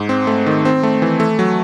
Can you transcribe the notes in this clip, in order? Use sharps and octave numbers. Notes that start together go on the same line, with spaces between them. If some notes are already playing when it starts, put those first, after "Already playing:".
Already playing: G#2
C4
A3
D#3
C4
A3
E3
A3
F#3